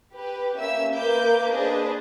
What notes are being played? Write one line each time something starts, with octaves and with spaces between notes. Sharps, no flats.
G4 B4
A#3 C#4 E5 E6
A#3 A#4 B4 D6 G6
D4 G#4 B4 C5 D#5